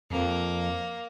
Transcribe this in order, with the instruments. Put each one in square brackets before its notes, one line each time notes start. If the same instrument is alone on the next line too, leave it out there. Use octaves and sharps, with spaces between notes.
[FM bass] F2 [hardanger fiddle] A#3